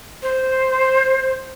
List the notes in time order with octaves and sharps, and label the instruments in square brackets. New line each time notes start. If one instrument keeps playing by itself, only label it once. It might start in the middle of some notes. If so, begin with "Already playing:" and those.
[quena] C5